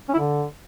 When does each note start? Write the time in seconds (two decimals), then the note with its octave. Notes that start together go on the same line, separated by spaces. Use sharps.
0.09 C#4
0.14 E4
0.19 D3